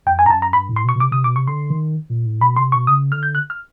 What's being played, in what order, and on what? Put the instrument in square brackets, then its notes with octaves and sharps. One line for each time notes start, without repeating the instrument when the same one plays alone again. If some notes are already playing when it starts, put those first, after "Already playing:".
[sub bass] F2 [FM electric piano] G5
[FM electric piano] G#5
[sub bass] G2 [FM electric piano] A#5
[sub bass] F#2 [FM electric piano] A5
[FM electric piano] A#5
[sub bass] G2 [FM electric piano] B5
[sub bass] A2
[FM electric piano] C6
[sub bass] B2
[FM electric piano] C#6
[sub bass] B2
[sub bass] C3 [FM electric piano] D6
[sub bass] C3 [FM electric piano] D#6
[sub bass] B2 [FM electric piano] D6
[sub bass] C3 [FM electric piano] C#6
[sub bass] D3 [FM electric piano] C6
[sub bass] D#3
A#2
A2
[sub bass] B2 [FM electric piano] B5
[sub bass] C3 [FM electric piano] C6
[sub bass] B2 [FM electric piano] C#6
[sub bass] C#3 [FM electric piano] D#6
[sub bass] D3 [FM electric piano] F6
[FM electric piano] G6
F#6
F6